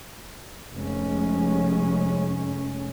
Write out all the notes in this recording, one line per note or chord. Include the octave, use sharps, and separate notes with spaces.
F1 G#3 C#4